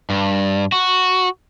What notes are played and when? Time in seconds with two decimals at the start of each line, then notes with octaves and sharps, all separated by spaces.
0.10 G2
0.72 F#4